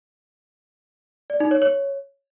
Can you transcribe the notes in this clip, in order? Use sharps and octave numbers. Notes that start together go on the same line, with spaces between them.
D5
D#4
C#5
C#5